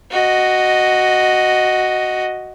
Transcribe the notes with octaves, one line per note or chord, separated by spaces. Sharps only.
F#4 D#5